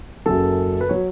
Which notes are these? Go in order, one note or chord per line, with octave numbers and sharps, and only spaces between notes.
F#1 F#2 C#3 F#3 A4
B4
F#3 C#5